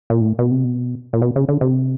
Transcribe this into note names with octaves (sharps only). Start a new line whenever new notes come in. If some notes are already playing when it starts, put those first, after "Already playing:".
A#2
A2
B2
C3
B2
A#2
B2
C#3
D3
C3